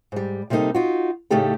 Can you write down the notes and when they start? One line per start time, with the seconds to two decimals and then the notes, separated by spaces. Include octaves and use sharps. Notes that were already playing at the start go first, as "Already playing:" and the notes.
0.12 G#2 G3
0.50 C3 G3 A#3 C#4 D#4 A4
0.75 D#4 F4 F#4
1.30 A2 C#3 A3 D#4 G4 A4